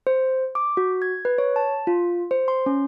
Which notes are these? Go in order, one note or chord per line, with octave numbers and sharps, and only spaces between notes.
C5
D6
F#4
G#6
B4
C#5
A5
F4
C5
C6
C#4